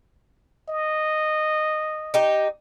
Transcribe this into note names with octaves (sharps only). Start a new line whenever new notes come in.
D#5
D#4 G4